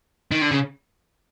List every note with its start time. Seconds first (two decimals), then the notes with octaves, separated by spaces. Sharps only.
0.31 D#3
0.42 D3
0.51 C#3